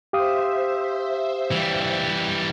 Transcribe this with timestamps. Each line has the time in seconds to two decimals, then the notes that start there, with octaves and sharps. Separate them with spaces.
0.13 G4 C5 E5 F5 D#6
1.52 E3 G3